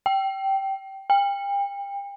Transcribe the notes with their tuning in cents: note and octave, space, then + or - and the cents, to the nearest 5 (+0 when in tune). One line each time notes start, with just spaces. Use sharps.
G5 -15
G5 +35